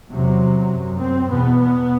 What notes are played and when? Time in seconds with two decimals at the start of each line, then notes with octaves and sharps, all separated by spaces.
0.11 E2 C3 F#3
0.70 F#2
0.99 C4
1.28 E2 B2 B3
1.58 B3